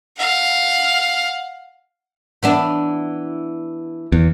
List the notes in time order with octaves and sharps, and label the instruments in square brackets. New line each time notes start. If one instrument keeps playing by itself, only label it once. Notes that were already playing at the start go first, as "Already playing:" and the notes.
[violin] F5 F#5
[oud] E3 B3 D4
[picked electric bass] E2